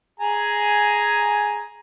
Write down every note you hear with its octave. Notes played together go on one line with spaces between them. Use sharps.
G#4 G#5 A#5